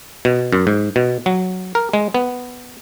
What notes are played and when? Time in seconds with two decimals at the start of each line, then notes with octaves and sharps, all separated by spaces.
0.25 B2
0.53 F#2
0.67 G#2
0.96 B2
1.26 F#3
1.75 A#4
1.93 G#3
2.14 B3